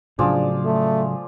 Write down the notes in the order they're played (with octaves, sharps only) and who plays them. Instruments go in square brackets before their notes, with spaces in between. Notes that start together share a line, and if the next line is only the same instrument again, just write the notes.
[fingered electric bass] A2 C#3 F#3 [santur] F3 G#4 D5 [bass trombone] D4
[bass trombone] A3